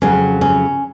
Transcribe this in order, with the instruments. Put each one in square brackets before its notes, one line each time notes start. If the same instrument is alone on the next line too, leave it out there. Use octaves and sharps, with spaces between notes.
[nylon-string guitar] F2 C#3 F#3 C#4
C#4